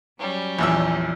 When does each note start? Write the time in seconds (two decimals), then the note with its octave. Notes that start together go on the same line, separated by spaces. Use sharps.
0.19 F#3 G3 C#4
0.59 A#1 E2 E6